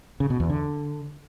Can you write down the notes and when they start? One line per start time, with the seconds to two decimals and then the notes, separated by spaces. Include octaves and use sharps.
0.20 C#3
0.30 B2
0.40 E2
0.50 D3